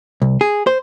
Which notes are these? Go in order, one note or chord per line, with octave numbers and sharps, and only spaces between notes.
C2
G#4
C5